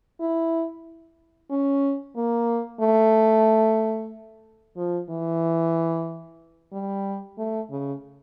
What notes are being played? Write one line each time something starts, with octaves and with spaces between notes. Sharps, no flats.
E4
C#4
A#3
A3
F3
E3
G3
A3
C#3